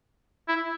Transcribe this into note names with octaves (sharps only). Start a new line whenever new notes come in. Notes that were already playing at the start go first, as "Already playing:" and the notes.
E4